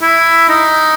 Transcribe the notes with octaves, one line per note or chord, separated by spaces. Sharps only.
E4
D#4